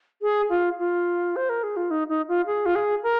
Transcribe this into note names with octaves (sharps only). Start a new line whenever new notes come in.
G#4
F4
F4
C5
A#4
G#4
F4
D#4
D#4
F4
G#4
F4
G#4
A#4